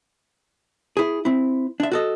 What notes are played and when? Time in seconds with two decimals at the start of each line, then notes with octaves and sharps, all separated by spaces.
0.97 E4 G#4
1.25 C4 E4
1.80 D4 E5
1.92 F#4 A4 D#5